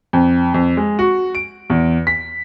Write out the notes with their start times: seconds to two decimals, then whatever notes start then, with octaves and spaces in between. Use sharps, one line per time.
0.13 F2
0.54 F2
0.77 G#3
0.99 F#4
1.35 D7
1.70 E2
2.07 B6